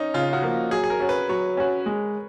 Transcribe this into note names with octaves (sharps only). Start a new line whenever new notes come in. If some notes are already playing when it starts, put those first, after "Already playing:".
Already playing: C#4 D#4
C#3 F4
F#4
F3 A#3
F#3 G#4
G#4
A#4
C#4 F#4
B4
F#3 C#5
C#4 F#4
G#3